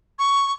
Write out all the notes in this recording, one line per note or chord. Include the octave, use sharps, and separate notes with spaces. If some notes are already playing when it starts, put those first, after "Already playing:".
C#6